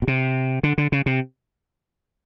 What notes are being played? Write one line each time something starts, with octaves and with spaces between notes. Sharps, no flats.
B2
C3
D3
D3
C#3
C3